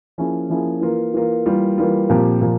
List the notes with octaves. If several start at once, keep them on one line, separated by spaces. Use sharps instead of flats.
F3 A#3 C#4 E4 G#4
F3 A#3 C#4 E4 G#4
E3 A#3 F4 A#4
E3 A#3 F4 A#4
E3 G3 A#3 F4
E3 G3 A#3 F4
A#2 F3 C4 G4
A#2 F3